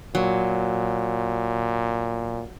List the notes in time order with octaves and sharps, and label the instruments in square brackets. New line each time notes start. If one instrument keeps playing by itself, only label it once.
[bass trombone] A#2 [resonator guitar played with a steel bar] F#3